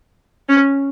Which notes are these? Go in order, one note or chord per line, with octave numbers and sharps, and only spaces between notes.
C#4